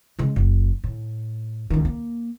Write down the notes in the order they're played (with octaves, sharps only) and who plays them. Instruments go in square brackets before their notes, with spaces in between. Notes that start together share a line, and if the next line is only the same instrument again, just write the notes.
[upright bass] C#3 G#3
F#1
A2
C#2 D#3
A#3